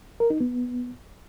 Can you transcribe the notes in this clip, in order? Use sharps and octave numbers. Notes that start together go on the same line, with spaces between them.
A#4
D#4
B3